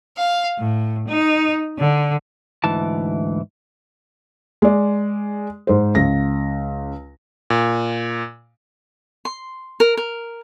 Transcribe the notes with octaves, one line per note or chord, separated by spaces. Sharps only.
F5
A2
D#4
D3
D2 G#2 E3 A5
G#3 D5
G#2 C5
C#2 A#6
A#2
C6
A#4
A#4